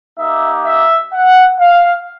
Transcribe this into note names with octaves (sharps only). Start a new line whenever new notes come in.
A#3 D#4 G4 E5
E5
F#5
F5